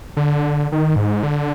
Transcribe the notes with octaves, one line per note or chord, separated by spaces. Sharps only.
D3
D#3
G#2
D3